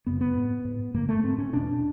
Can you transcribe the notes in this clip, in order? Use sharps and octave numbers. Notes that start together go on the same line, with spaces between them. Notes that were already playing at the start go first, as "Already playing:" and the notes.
F#2 C#3 B3
B3
G#2
G#2
G2 D3 A#3
A3
G#2 C4
C#4
E2 B2 D4